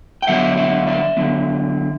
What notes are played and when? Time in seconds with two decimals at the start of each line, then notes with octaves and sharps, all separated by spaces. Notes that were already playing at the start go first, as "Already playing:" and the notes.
0.22 G5
0.27 D3 F#3 B3 E5 F#5
0.57 E5 F#5
0.87 D5 E5
1.17 D3 F#3 B3